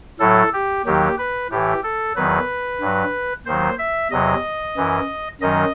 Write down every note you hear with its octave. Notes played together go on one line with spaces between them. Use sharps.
A2 F#3 A4
G4
D#2 D#3 F#3 G4
B4
A2 E3 G4
A4
E2 D#3 F#3 B4
G2 F#3
D#2 D#3 F#3 C5
E5
E2 C3 F#3 D#5
F#2 E3
F#2 D#3 F#3 D#5